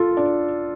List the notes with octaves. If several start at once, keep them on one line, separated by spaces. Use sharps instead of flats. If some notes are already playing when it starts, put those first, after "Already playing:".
Already playing: F4 A4
D4